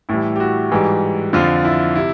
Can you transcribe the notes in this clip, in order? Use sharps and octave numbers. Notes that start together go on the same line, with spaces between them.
A2 E3 G3 E4
G4
F#4
G#2 E3 G3
F2 D3 F3 F4
E4
C3 E4